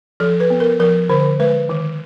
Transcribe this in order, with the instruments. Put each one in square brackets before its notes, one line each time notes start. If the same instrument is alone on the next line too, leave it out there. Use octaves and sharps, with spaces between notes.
[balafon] F3 A4
B4
B3
A#4
F3 A#4
D3 C5
G#3 B4
D#3